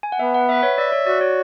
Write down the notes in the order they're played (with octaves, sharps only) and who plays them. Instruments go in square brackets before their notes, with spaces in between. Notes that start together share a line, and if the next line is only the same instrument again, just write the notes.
[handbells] G#5
F#5
[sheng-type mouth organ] B3 [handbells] E5
[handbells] F#5
[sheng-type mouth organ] B4 [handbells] E5
[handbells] C#5
[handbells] D5 [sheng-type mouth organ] E5
[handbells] C#5
[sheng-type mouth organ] F#4 [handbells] D5
[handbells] C#5